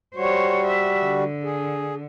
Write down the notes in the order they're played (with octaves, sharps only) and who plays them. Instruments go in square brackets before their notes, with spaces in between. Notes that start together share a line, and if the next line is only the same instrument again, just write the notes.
[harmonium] G3 F#4 [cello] C5 C#5
[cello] E5
D3
[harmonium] G#4